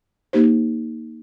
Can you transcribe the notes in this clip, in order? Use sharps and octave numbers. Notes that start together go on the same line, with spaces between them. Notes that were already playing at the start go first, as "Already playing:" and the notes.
A#3 D#4 G4 C5